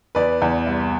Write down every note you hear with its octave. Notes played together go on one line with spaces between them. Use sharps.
E2 B4 D5
E2
C2